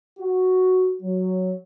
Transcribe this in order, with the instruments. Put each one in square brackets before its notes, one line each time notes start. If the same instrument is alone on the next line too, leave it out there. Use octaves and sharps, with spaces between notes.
[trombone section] F#4
F#3